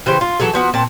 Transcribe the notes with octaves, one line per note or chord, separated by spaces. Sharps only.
C#3 E3 G4 C5
F4
E3 F#3 G#4 A4
F3 B3 F#4
A#2 C4 A5